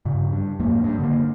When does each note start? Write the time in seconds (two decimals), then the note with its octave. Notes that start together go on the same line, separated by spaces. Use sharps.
0.05 G2 C#3
0.32 G2
0.59 A1 F2 G#2 A#3
0.84 G2 G3
1.00 D3 A#3